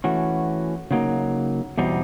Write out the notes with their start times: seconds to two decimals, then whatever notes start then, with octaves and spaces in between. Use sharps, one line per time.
0.04 E3 A3 C#4 F#4
0.91 C#3 F#3 A#3 D#4
1.78 E2 B2 G3 C4 D#4